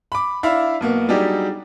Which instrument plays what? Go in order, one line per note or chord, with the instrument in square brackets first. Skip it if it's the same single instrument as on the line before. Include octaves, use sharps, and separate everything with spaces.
[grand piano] B5 D6
D4 E4 E5 F5 B5
B1 A#3 B3
F#3 G3 D4 D#4 G4 G#4